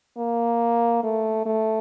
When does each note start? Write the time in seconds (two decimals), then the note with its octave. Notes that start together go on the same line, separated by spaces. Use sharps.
0.18 A#3
1.04 A3
1.46 A3